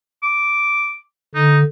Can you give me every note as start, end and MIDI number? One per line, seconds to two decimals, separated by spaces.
0.23 0.97 86
1.35 1.64 50
1.35 1.58 63